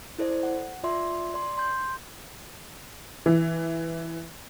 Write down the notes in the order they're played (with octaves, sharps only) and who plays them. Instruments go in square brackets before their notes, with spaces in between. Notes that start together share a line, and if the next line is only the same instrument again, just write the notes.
[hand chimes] E4 A4 C5 D5
F#5
F4 D5 E5 C6
D5 C6
C6 G6
[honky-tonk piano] E3